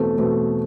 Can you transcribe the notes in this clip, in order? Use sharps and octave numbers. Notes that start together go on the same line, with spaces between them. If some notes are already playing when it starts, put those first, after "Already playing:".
Already playing: E2 B2 A3 C4 A4
E2 B2 A3 C4